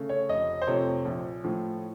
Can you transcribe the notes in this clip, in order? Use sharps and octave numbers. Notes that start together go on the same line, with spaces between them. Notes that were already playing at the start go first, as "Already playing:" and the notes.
Already playing: C#3 A3
C#5
F1 D#5
C5
F2 C3 F3 A3 C#5
A#1
A2 F3